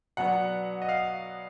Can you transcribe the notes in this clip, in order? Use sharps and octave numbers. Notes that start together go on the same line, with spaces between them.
B2 F#3 B3 D4 F#5
D#5
F5